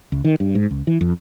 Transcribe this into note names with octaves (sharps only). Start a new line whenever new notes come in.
C#2
D#3
G2
G#2
C#2
E3
F2